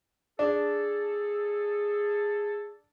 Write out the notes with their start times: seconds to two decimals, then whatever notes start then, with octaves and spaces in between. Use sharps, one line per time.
0.39 D4 G#4 A4